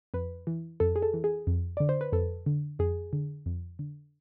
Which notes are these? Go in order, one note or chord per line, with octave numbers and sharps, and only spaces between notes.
F2 B4
E3
F2 A4
G#4
A4
E3
G#4
F2
D3 D5
C5
B4
F2 A4
D3
F2 G#4
D3
F2
D3